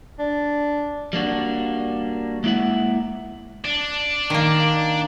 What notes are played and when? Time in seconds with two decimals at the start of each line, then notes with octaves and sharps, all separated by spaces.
0.19 D4
1.13 G3 A#3 D4 F#4
2.44 G#3 A#3 E4 E5 F#5
3.65 D4
4.30 D#3 A#3